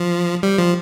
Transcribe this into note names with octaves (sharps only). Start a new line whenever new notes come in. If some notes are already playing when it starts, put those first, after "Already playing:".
Already playing: F3
G3
F3